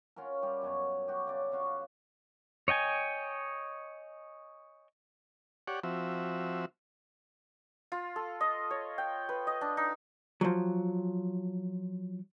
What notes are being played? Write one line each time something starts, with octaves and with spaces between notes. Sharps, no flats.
C#4 F4 F#4 A#4
G3 F4 G4
F#2 B2 C#5
F#4 G4
C#3 D5
F4 F#4 C#5 F5
C#5 D#5 G5 G#5
G4 C#5 D5 F#5
F3 C4 F#4 E5
F4
A4
D#5
C#5
G5
B4
D#5
D4
D#4
F3 F#3